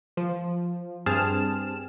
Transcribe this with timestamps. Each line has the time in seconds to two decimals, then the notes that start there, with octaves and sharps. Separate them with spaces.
0.17 F3
1.06 G2 C4 G#4 A5 F6 E7